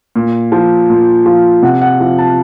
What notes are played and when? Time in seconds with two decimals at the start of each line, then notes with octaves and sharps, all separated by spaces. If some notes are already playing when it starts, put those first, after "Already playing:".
0.16 A#2
0.52 F3
0.90 A#2
1.26 F3
1.62 C3 F#5
1.82 F#5
2.00 F3
2.18 A5